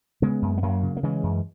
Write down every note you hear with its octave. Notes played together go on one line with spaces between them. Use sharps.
C#3 G#3 B3
F#2
B3
F#2 F#3 A#3
C#3
A#3
C#3 E3 G#3
F#2